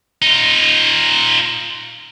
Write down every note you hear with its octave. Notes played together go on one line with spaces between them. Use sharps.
D#4 F4